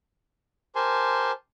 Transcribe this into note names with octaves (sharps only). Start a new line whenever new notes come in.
G4 A#4 C5 G#5 A5 C6